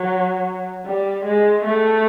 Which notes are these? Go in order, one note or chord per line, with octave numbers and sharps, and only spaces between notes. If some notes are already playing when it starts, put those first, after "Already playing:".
Already playing: F#3
G3
G#3
A3